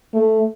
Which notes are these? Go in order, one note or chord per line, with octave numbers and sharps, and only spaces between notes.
A3